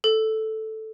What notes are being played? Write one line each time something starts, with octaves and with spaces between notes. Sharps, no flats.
A4